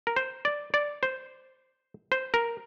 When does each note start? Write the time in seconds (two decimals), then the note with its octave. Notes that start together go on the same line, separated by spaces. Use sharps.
0.07 A#4
0.16 C5
0.45 D5
0.74 D5
1.03 C5
2.12 C5
2.34 A#4